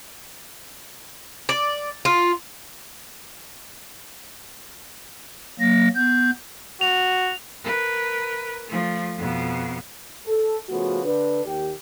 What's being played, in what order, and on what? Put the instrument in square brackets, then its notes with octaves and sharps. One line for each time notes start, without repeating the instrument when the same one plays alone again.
[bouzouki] D5
F4
[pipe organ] F#3 A#3 A#6
B3 G6
[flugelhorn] F#4 [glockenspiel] F7
[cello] A#4 B4
F3 A3
F2 B2
[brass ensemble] A4
C#3 F3 A3 B3 F#4
D3 D4 B4
D#2 G4